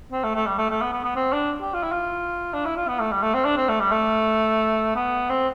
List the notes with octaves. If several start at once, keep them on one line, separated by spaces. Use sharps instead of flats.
C4
A3
A3
G3
A3
A3
B3
B3
B3
C4
D4
G4
F4
E4
F4
D4
E4
F4
B3
A3
G3
A3
C4
D4
C4
A3
G3
A3
B3
C4